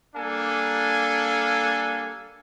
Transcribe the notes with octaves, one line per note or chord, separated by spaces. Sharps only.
G3 A#3 D4 A4 F5 G#5